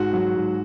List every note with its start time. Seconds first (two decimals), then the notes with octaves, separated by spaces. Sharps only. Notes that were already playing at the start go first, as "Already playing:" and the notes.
Already playing: G#2 F#4
0.13 F#3
0.36 G#2